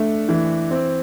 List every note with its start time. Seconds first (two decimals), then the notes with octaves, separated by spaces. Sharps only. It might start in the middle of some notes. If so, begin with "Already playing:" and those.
Already playing: A3 D4
0.29 E3
0.71 C4